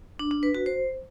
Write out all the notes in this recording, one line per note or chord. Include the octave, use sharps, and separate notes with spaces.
D4
D4
B4
F#4
C5